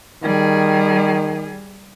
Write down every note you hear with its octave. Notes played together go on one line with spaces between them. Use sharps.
D#3 G3 G#4